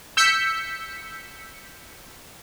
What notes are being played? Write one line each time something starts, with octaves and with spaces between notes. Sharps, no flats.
E6 G6 B6 C#7